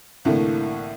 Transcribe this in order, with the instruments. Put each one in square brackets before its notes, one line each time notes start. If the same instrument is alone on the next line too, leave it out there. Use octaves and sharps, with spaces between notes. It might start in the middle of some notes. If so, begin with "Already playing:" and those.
[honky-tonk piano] C2 A2 D3 E3 A3 A#3